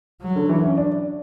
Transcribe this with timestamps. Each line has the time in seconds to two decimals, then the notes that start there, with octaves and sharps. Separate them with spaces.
0.22 F#3
0.36 D3
0.49 E3
0.64 C#4
0.77 D4